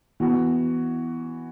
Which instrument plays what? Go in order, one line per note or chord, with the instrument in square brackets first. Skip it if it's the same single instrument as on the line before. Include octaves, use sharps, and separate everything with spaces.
[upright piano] E3 B3 F#4